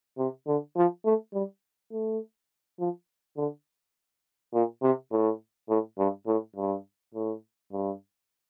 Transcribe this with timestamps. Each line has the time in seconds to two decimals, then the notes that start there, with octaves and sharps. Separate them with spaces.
0.18 C3
0.47 D3
0.76 F3
1.05 A3
1.34 G3
1.92 A3
2.79 F3
3.37 D3
4.54 A#2
4.82 C3
5.12 A2
5.69 A2
5.98 G2
6.27 A2
6.56 G2
7.14 A2
7.72 G2